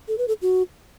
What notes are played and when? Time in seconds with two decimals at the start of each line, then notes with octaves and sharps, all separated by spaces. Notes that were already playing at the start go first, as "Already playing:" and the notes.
0.08 A4
0.18 B4
0.28 A4
0.42 F#4